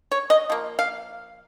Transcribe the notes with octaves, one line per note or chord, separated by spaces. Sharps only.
C#5
D#5
F3 A#3
F5